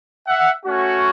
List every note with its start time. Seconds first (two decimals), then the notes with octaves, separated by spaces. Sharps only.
0.27 E5 F#5
0.65 A3 C#4 F#4